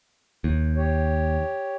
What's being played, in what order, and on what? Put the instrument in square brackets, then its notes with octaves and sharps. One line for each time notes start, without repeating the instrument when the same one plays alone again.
[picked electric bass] D#2
[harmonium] G4 C#5